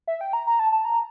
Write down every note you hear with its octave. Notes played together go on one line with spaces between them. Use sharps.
E5
G5
A#5
A#5
A5
A5
A#5